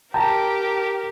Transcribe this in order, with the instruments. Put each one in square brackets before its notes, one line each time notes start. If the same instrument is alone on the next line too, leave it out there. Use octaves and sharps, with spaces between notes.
[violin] G4 A#4 [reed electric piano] G5 A#5 [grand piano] A5